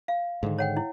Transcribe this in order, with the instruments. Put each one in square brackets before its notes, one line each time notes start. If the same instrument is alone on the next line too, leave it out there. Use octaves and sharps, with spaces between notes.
[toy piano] F5
[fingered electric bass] G#2 D3 D#3
[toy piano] C#5 F#5 G5
E4